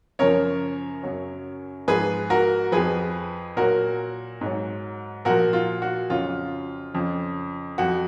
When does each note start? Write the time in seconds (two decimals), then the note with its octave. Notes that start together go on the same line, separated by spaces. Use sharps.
0.19 F#2 C#3 F3 A#4 C#5
1.03 F#2 C#3 F#3
1.88 G#2 F3 G#4 B4
2.30 F#4 A#4
2.72 F2 F3 G#4 B4
3.56 A#2 F#3 F#4 A#4
4.41 G#2 F#3
5.25 A#2 F3 F#4 A#4
5.53 F4
5.82 F#4
6.10 F2 C#3 F#3 F4
6.94 F2 C#3 F3
7.78 F2 F3 F#4